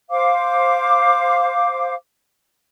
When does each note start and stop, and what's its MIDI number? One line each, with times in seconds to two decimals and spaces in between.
0.10 1.95 72
0.10 1.95 77
0.10 1.95 86